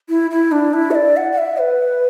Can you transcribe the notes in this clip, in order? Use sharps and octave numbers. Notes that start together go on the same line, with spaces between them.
E4
E4
D4
E4
E5
D5
F#5
F#5
E5
B4